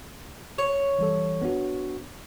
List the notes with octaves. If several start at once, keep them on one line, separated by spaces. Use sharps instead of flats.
C#5
E3 G3 A4
B3 D4 F#4